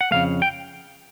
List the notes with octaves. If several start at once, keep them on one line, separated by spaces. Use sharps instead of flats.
F#5
F2 C#3 F3 A3 F5
G5